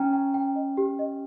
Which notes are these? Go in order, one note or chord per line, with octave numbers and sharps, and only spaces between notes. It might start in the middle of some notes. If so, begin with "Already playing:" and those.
Already playing: C#4 G5 A#5
G5
G5
D#5
G4
D#5